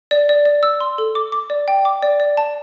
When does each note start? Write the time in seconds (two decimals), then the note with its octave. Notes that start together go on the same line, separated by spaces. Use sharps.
0.11 D5
0.29 D5
0.45 D5
0.63 E6
0.80 C6
0.98 A4
1.15 D6
1.32 D6
1.50 D5
1.68 G5
1.85 D6
2.02 D5
2.20 D5
2.37 A5